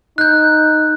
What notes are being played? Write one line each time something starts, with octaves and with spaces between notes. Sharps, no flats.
D#4 F#6 G6